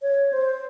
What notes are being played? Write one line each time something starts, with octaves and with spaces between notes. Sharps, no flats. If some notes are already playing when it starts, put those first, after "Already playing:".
C#5
C5